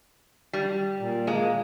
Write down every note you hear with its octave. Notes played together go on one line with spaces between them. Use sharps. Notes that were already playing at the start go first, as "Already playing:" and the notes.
G3
A#2
G#3 A#3